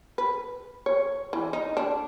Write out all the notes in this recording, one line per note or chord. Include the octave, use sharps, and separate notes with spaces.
B4
C#5
E3
D#4
D4